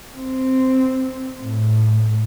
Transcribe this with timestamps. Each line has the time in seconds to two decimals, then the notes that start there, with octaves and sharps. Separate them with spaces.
0.15 C4
1.41 A2